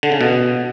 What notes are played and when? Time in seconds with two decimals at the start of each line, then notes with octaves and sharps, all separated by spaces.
0.03 D3
0.12 C#3
0.21 B2